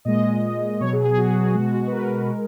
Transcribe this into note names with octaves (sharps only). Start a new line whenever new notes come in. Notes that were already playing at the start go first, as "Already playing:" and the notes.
A#2 G#3 D#5
B2 F#3 C#5
G#4
G#4
F#4
G#4
B2 G#3 F#4
F#4
B4
A#4
G#3